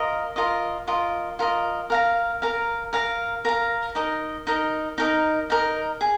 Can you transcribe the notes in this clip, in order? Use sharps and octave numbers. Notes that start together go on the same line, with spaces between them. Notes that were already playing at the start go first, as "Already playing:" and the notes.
Already playing: F4 A#4 D#5
F4 A#4 D#5
F4 A#4 D#5
F4 A#4 D#5
A#4 F5 A#5
A#4 F5 A#5
A#4 F5 A#5
A#4 F5 A#5
D#4 A#4 D#5
D#4 A#4 D#5
D#4 A#4 D#5
D#4 A#4 D#5
G#4